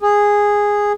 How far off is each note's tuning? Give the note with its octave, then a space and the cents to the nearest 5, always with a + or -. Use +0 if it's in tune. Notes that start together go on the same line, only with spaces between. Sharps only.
G#4 -10